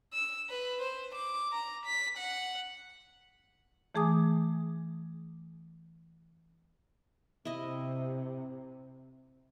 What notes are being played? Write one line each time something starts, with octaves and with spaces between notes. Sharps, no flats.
E6
B4
C5
D6
A#5
B6
F#5
E3 A3 G#4 G#5 D6 D#6
C3 E4 D#5